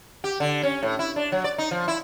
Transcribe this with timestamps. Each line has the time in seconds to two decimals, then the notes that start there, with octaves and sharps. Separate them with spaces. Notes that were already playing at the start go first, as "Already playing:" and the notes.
0.24 G4
0.40 D3
0.63 C#4
0.83 A2
0.99 E4
1.16 D4
1.32 F#3
1.44 D5
1.58 D#4
1.71 F3
1.88 E4